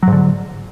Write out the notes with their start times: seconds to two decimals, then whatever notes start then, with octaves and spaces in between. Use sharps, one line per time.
0.03 F#3
0.07 G#2
0.12 D3